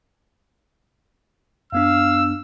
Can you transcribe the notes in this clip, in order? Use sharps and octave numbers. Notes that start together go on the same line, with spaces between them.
F#2 B3 D4 F5 E6